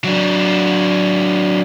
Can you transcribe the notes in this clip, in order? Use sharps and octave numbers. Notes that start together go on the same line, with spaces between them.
F#3 D4